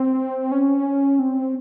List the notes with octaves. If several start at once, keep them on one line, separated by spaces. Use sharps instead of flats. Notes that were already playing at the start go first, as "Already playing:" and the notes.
Already playing: C4
C#4
C4